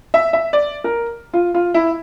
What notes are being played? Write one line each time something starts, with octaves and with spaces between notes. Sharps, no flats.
E5
E5
D5
A#4
F4
F4
E4